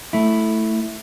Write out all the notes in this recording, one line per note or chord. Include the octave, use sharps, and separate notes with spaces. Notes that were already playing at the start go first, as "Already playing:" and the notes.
A3 E4